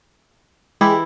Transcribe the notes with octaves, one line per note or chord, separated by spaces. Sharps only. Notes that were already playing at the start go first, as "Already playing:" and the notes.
E3 G#3 E4 G4